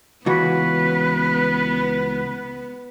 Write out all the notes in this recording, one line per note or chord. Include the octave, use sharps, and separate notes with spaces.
C#2 E3 B3 F#4 B4